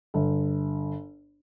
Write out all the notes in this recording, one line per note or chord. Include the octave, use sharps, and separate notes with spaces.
G1